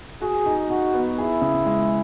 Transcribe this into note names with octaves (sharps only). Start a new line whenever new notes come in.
F#4 G#4
D#4
D#4 F#4
B3
E4 G#4
C#3
G#3